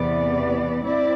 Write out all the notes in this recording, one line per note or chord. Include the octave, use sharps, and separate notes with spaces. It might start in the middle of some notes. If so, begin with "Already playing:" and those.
Already playing: E2 C3 E3 B3 D5
C4 E4 D5